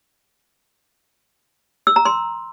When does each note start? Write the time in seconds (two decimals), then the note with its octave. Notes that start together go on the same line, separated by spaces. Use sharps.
1.87 E6
1.96 A#5
2.05 C6